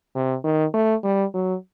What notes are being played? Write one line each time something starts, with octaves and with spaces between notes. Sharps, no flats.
C3
D#3
A3
G3
F#3